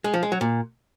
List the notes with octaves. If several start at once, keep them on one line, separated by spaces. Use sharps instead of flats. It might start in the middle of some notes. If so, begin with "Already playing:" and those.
G#3
F3
G#3
F#3
A#2